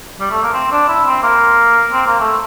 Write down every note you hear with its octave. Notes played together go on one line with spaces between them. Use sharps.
G3
A3
A#3
C4
D4
E4
C4
A#3
C4
A#3
A3